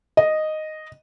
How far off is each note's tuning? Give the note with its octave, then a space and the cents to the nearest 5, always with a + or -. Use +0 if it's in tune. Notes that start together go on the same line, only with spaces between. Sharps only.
D#5 -5